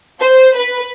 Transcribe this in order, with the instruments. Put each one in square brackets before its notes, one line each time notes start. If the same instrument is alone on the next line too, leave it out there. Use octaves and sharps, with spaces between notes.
[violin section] C5
B4